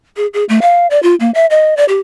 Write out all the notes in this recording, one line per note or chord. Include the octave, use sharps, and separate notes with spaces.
G#4
G#4
A3
F5
D5
F4
A#3
E5
D#5
D5
G4